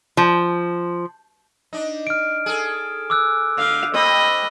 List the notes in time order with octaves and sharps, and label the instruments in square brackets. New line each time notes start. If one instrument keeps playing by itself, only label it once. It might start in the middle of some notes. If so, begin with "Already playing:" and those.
[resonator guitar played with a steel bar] F3
[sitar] D4 D#4
[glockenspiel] F6 D7
[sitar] G#4 A4
[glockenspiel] D6 E6 F#6
[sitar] D3 [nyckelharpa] F5
[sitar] C4 [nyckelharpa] D#5 B5